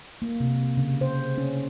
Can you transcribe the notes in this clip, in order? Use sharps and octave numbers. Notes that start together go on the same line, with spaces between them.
A#3
C3
C#3
C5
C#4